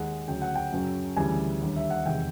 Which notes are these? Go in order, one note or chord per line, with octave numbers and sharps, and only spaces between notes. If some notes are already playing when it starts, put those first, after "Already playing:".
Already playing: D#2 D#3 G#3 F#5
D2 C#3 F#3 G5
F#5
G5
F#2 C#3 F#3
D2 C#3 E3 G3 G#5
D#2 D3 G3
E5
F#5
E2 C3 D#3 G#3 G5